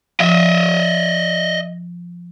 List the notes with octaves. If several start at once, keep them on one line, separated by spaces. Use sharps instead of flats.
F3 D#5 E5